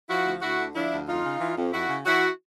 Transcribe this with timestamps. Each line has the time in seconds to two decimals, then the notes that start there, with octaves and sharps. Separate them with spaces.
0.09 F3 E4 F#4
0.26 D2
0.42 D2 E4 F#4
0.58 D3
0.74 F3 D4 E4
0.91 D2
1.07 F2 D#4 F4
1.23 C#3
1.40 E3
1.57 F2
1.73 F2 E4 F#4
1.89 C#3
2.05 E3 E4 F#4